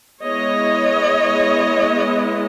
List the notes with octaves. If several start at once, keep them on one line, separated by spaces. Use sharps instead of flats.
G#3 B3 E4 C#5 D#5